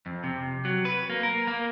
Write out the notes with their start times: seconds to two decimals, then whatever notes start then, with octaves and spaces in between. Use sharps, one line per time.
0.06 F2
0.24 C3
0.65 F#3
0.85 B4
1.10 A#3
1.23 A#4
1.47 A#3